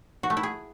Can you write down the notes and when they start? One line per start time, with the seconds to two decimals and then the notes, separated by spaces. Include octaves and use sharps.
0.23 F#4
0.30 A3
0.37 E4
0.43 G#4